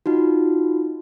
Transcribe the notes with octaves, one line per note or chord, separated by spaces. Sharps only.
D#4 F4 F#4